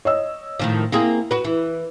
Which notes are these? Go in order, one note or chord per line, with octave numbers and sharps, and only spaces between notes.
C#5 D#5 E6
A2 D#3 F3
A#3 C4 E4 G#4
F#4 B4
E3 E4